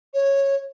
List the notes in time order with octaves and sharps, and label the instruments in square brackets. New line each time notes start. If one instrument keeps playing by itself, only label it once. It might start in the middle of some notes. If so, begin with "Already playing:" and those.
[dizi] C#5